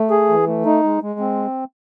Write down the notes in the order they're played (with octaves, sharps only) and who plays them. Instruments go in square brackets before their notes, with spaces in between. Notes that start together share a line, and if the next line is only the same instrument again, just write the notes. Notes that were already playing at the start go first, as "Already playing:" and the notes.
Already playing: [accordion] A3
G#4
E3
A3
D#4
G#3
G#3
C4